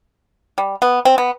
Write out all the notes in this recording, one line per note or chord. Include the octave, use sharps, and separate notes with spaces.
G3
B3
C4
B3